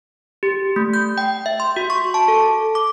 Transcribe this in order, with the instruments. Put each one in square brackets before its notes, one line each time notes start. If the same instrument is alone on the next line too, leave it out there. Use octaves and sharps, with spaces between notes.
[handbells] G4
A3
G6
G5
E5
C6
F#4
C#6
A5
A4
D6